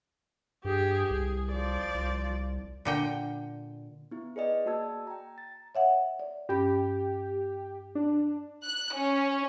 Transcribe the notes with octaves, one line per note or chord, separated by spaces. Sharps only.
G2 G4 G#4
C2 G#4
F3 D5
C2
A#2 D3 G5
B3 E4
G#4 B4 D5 D#5 G5
A#3 F#4 D5 A5 E6 G#6
G5 A#5
A6
C#5 E5 F#5
D5
G2 C#4 G4 B5
D4
F#6
C#4